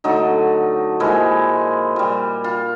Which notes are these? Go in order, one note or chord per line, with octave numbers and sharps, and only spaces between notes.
D3 F#3 A3 D#4
A#2 F3 G#3 E4
A#2 G3
F4